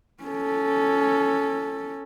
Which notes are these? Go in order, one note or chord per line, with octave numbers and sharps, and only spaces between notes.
C#4 A4